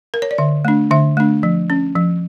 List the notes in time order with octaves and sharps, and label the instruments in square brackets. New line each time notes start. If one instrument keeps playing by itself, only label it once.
[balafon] A#4
C#5
D5
D3 E5
A3 D4
D3 E5
A3 D4
F3
C#4
F3